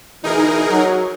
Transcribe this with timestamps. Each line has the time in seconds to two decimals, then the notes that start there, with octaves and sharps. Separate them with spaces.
0.24 D2 B2 E3 D#4 G#4 A#4
0.70 F#3